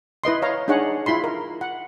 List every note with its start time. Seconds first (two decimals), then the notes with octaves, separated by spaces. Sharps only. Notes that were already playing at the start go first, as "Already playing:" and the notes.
0.24 E4 B4 D#5 C6
0.42 C#5 F5 A#5
0.68 D4 D#4 G#4 C#5 F#5
1.06 E4 F4 B5 C6
1.24 A#4
1.61 F#5